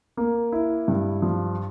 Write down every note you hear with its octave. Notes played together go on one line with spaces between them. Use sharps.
A#3
E4
G2
F3